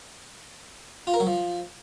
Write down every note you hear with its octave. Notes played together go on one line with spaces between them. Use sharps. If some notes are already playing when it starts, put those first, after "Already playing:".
F4
A#4
F#3
F3